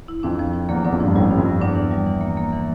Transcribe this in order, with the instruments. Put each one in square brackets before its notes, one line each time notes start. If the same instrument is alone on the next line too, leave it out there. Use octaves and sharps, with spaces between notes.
[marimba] E4
[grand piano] F2 [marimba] D4
[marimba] F3
F3
[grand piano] E2 [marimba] A#3
[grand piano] E2 [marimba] D4
[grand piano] F2
[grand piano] G2 [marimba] F3
[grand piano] A1 A2 [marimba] G3
[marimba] G2
[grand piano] F2
[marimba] G2
[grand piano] E2 [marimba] D4
[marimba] E3
G3
E3
A#3
A#3
E3